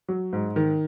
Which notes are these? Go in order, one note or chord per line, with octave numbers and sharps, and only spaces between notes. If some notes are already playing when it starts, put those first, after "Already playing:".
F#3
G#2
D#3